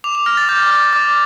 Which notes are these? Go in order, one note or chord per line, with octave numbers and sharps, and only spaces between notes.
D6 F7
F7
F6 A#6
A6
D6 G6
F6
D6